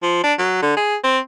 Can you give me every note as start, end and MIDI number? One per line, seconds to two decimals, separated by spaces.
0.03 0.22 53
0.24 0.33 62
0.39 0.61 54
0.62 0.73 50
0.77 0.96 68
1.04 1.19 60